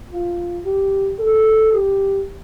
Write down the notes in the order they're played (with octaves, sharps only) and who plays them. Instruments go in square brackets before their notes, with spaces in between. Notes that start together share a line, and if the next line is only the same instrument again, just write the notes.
[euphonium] F4
G4
A4
G4